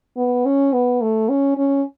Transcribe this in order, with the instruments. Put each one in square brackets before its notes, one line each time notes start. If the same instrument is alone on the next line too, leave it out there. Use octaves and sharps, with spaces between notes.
[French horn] B3
C#4
B3
A3
C#4
C#4